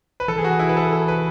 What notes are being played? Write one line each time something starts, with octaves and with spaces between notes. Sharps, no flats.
B4
E3 A4
G#4
F#4
E4
B4
A4
A4
B4